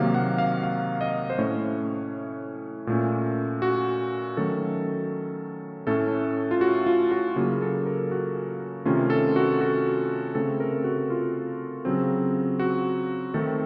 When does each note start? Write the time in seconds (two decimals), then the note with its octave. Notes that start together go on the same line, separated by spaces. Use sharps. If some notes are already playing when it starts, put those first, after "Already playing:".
Already playing: C3 D#3 F#3 A#3 F5
0.14 F#5
0.38 F5
0.63 F5
1.01 D#5
1.30 C5
1.38 A2 A3 C#4 C#5
2.87 A#2 A3 C#4
3.62 F#4
4.37 D#3 F#3 A3 C#4 A4
5.87 A2 A3 C#4 A4
6.51 F4
6.61 F#4
6.86 F4
7.11 F#4
7.36 C#3 F#3 A#3 C#4
7.62 A4
7.87 A#4
8.11 F#4
8.85 C3 D#3 A3 C#4 F4
9.10 A4
9.36 F#4
9.61 F#4
10.35 C#3 A3 C4 A4
10.60 A#4
10.84 F#4
11.10 F4
11.85 C#3 F#3 C4
12.59 F#4
13.34 D#3 A3 C4 A4